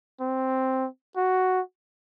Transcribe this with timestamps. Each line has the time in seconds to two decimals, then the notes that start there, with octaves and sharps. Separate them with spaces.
0.20 C4
1.16 F#4